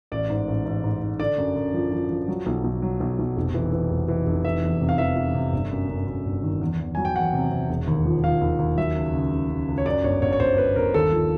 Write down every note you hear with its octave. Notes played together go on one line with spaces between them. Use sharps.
A1 D5
G#2
A1
A1
G#2
G#2
D3 D5
F#2
F#2
F3
F3
F3
F#3
B1
B1
F#3
B1
B1
F1
E3
E3
F1
E3
F1
E3 E5
E2
C3
F5
E3 E5
E3
C3
G1
F#2
F#2
F#2
G1
D#3
E2
E2
F#3 G#5
G5
E2 F#5
C3
C3
E1
D#2
F3
F3 F5
D#2
D#2
F#3 E5
C#2
C#3
C#3
C#3
C#2
C#5
F#2 D5
G1 C#5
G1 C#5
C#5
G1 C5
G1 B4
G1 A#4
D#2 A4
F3